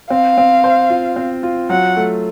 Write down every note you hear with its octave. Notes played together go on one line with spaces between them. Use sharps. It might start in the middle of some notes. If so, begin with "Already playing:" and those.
C4 F5
C4
C5
F4
C4
F4
F#3 F#5
A3